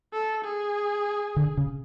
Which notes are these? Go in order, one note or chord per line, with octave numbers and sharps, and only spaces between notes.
A4
G#4
D3
C#3